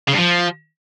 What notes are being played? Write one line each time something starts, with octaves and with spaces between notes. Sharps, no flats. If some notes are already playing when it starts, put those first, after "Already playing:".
C#3
G2
F3